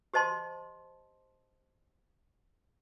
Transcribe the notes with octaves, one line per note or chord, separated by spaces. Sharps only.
G4 C5 D#5 A5 C6